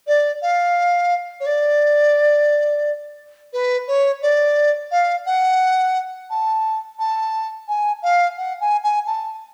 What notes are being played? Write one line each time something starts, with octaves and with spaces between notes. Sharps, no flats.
D5
F5
C#5
D5
B4
C#5
D5
F5
F#5
A5
A5
G#5
F5
F#5
G#5
G#5
A5